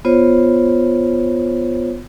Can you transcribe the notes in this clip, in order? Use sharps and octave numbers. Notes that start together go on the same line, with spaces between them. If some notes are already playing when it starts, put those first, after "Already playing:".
B3 F4 C5 C#5